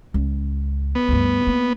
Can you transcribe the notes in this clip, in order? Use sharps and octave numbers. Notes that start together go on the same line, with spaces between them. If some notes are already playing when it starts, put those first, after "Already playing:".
C#2
B3
D2 G2
A#3 C4